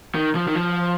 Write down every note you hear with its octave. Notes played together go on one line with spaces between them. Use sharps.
D#3
F3
D#3
F3